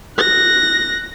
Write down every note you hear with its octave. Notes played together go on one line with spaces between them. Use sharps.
F#6 A#6